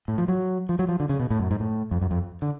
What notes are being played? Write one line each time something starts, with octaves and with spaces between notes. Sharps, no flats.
A2
F3
F#3
F3
F#3
F3
D3
C#3
B2
A2
F#2
G#2
A2
F2
F#2
F2
D3